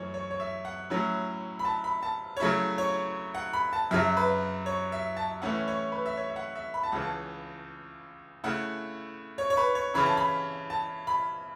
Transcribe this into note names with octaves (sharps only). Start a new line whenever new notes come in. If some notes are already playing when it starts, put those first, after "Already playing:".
Already playing: F#2 E3 A3 C#5
C#5
C#5
E5
F#5
A2 F#3 C#4 E4
B5
A5
B5
A5
C#5
C#3 F#3 A3 E4 E5
C#5
F#5
B5
A5
F#2 C#3 F#3 E5
B4
C#5
E5
A5
A2 E3 A3 C#4 E4 F#5
C#5
B4
E5
C#5
E5
F#5
E5
B5
A5
C#2 C#3 E3 F#5
A5
C#3 A3 E4 F#5
C#5
C#5
B4
C#5
C#3 E3 C#4 E4 B5
A5
B5
A5
B5